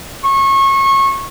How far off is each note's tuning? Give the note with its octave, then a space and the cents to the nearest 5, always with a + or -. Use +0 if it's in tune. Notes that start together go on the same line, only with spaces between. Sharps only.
C#6 -25